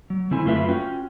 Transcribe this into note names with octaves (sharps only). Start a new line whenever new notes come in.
F#3
D3 C4 E4 G#5
F#2 A3 F4 B4 E5
C#4 F4 F#4 G5